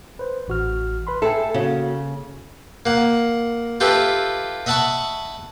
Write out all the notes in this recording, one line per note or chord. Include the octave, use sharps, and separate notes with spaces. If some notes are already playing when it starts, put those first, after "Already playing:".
B4 C5
A1 F#4 F6
B4 B5 C6
G#4 A4 E5 G5
C#3 A#3 F#4
A#3 F#5
F4 G4 A4 B4 E5
D#5 E5 F#5 A5 B5 C#6